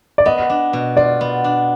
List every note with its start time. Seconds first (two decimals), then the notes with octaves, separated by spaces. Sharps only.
0.18 D5
0.25 B3 D#5
0.50 D4
0.73 B2
0.97 F4 D5
1.21 B3
1.44 D4